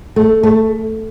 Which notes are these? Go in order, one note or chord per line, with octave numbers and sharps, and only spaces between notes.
A3
A3